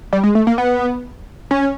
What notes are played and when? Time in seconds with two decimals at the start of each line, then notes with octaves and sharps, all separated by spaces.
0.13 G3
0.24 G#3
0.35 A3
0.47 A#3
0.58 B3
1.51 C#4